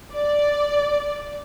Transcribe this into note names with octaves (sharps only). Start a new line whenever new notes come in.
D5